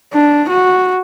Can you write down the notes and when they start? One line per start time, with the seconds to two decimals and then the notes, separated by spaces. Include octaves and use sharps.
0.13 D4
0.50 F#4